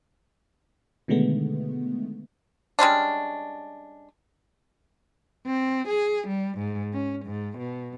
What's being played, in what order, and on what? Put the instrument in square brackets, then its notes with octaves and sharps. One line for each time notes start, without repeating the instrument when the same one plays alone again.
[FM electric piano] B2 D3 D#3 G#3 A3 B3
[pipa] G3 G#3 C#4 D4
[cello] C4
G#4
G3
G#2
C#4
G#2
B2